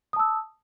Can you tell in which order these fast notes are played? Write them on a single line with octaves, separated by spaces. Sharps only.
D#6 A5 E6